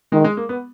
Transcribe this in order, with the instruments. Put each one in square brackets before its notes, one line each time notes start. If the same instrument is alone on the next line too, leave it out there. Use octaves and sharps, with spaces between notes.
[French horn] D#3 [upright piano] G#3
[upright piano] G#3
A#3
B3